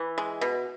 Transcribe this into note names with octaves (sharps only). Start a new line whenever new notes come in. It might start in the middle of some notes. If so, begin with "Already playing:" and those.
Already playing: E3
G#3
B2